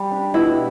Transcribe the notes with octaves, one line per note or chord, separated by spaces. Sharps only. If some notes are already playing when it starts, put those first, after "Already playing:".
Already playing: G3
D4 G4
B2 E4